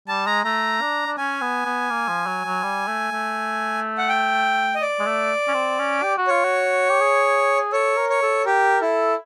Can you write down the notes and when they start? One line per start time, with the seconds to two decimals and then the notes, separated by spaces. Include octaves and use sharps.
0.08 G3 A5
0.27 G#3 A#5
0.45 A3 A#5
0.81 D4
1.06 D4
1.17 C#4 G#5
1.41 B3
1.65 B3
1.90 A#3
2.08 F3
2.26 F#3
2.45 F#3
2.63 G3
2.87 A3
3.11 A3
3.98 F#5
4.09 G5
4.75 D#5
4.82 D5
4.99 G#3
5.06 A3
5.48 C#4
5.54 C4
5.79 C#4
6.03 G4
6.17 F#4
6.27 F4 C#5
6.44 F#4
6.90 G4
7.00 G#4
7.73 A4 C#5
7.97 A#4
8.10 C#5
8.22 A4
8.46 G4 A#4
8.82 E4 A4